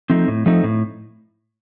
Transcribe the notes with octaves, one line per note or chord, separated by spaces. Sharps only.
F3 A3 C4 D#4
A2
F3 A3 C4 D#4
A2